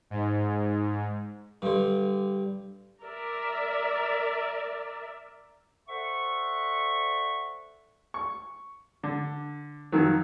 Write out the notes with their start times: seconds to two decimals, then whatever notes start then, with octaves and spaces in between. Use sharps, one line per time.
0.10 G#2
1.62 G2 D3
3.02 A#4 D5 E5
5.89 A4 C5 D5 E5 F#5 C#6
8.14 C#6
9.03 D3
9.92 F2 D#3 F#3